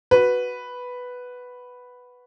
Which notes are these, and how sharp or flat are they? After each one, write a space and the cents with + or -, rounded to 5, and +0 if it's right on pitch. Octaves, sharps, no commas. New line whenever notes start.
F#4 +0 B4 +0